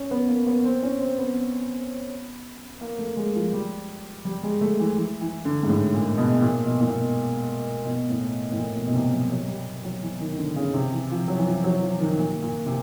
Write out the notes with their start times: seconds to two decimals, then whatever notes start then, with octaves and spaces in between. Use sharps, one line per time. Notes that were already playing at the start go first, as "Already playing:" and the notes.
Already playing: C#4
0.11 B3
0.28 A#3
0.47 B3
0.65 C4
0.83 C#4
1.01 C4
1.18 B3
2.81 A#3
2.99 A3
3.17 G#3
3.35 F3
3.53 G3
4.25 G3
4.43 G#3
4.61 A3
4.80 E3
4.97 E3
5.21 E3
5.45 D3
5.63 G#2
5.69 A2
5.93 A#2
6.18 B2
6.42 A#2
6.65 B2
6.81 A#2
6.89 B2
7.85 B2
8.10 A2
8.52 A2
8.57 A#2
8.76 B2
8.86 B2
8.94 C3
9.12 F#3
9.30 F#3
9.48 G3
9.84 F#3
10.02 E3
10.20 D#3
10.38 D3
10.56 C#3
10.74 C3
10.92 E3
11.10 F3
11.28 F#3
11.38 E3
11.46 F3
11.64 F#3
11.82 F3
12.00 D#3
12.18 A#2
12.42 A#2
12.66 C3